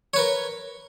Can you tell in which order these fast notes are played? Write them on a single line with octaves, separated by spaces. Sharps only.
C#5 B4 A#4